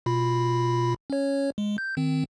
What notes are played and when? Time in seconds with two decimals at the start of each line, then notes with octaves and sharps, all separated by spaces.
0.06 B2 F4 B5
1.10 C#4 C#5
1.58 G#3
1.78 G6
1.97 D#3 C4